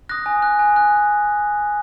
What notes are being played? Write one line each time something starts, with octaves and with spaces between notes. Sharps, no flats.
D#6 F#6 A#6
G#5
F#6
G#5
F#6